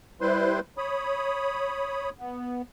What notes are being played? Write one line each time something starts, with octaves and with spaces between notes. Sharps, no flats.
G3 E4 B4 C5 C6
C#5 B5 D#6
B3